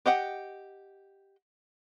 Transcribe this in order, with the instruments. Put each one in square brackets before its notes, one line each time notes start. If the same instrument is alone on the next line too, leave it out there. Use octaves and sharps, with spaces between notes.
[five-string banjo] G4 D#5 F#5 G5